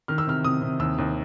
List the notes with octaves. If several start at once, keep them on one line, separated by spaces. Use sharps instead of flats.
D#3 F6
E6
C3 F6
C3 D#6
C3
D#2 E6
D#2